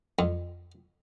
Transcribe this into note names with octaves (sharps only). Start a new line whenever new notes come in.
F2